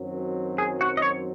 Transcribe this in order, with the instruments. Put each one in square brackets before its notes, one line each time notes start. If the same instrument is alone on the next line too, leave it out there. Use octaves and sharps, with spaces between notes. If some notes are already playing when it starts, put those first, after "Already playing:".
Already playing: [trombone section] F#2 D#3 F#3 C4
[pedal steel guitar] G#4
F#4
D#5
C#5